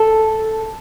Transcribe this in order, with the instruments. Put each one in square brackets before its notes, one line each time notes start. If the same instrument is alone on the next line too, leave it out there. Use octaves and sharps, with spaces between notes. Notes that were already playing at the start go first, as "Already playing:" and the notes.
Already playing: [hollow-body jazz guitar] A4